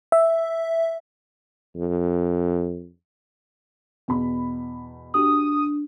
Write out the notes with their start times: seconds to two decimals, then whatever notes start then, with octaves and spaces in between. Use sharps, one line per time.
0.12 E5
1.76 F2
4.08 E2 B2 B5
5.14 D4 F#4 G4 D#6